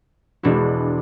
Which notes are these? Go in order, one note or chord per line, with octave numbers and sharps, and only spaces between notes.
E1 G#3 D4 E4 F#4